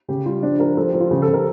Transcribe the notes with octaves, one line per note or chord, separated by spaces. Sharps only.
C#3 G4
G3 F4
F3 D4
F3 A#4
F3 A4
G4
F3
F4
C#3 G4
A4
C#3
A#4